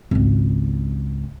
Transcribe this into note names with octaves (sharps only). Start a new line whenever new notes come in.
G#1 C#2